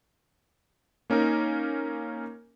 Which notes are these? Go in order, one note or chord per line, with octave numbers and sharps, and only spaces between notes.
A#3 C#4 D#4 A#4